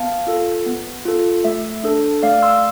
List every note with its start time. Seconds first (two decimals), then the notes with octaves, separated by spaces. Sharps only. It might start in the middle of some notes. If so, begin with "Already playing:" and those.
Already playing: B3 F5 A5
0.27 F4 A4
0.66 B3
1.05 F4 A4
1.44 A3 E5
1.84 D4 A4
2.23 A3 D5 F5
2.42 C6 E6